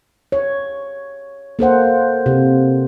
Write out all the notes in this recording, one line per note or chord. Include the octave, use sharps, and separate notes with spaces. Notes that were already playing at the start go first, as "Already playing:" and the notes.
C#5
A#3 A4 C5 F#5
C3